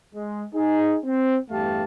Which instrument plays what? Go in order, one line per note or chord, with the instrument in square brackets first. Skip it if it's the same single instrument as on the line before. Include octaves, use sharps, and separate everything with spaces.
[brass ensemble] G#3
D#4 G#4
C4
E2 G2 A3 G4 F5 A5